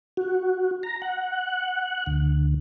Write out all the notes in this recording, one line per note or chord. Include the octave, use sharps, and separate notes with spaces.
F#4
A#5
F#5
D2